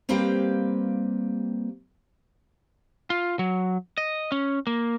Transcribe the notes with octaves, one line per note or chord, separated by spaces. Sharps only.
G3 A#3 C4 G4 B4 F5
F4
F#3
D#5
C#4
A#3